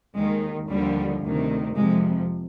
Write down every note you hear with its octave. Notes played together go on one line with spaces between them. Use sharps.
D#2 D#3 G#3
D#2 D3 F3 G3
D2 C3 D#3
F2 C3 F3 G#3